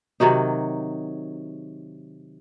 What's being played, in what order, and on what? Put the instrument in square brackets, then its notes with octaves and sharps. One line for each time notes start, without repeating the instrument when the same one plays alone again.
[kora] C3 D#3 F#3 D#4